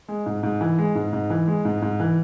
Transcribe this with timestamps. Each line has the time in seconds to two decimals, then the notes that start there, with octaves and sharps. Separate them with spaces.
0.08 G#3
0.26 G#2
0.43 G#2
0.61 E3
0.78 G#3
0.95 G#2
1.13 G#2
1.30 E3
1.48 G#3
1.65 G#2
1.82 G#2
2.00 E3